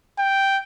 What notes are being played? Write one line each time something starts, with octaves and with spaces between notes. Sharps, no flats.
G5